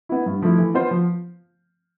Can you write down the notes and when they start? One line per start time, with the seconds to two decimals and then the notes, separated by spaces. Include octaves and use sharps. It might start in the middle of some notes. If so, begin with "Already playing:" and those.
0.09 B3 E4
0.26 G2
0.42 F3 A3 E4
0.58 E3
0.74 B3 F4 C5
0.91 F3